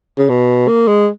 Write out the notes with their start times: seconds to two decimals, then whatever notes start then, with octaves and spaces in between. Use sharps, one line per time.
0.18 C#3
0.29 B2
0.68 A#3
0.88 G#3